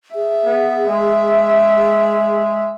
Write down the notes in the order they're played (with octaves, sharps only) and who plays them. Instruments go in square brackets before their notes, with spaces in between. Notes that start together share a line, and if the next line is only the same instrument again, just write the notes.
[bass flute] G#4 [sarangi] E5
[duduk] B3
G#3
[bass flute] G#4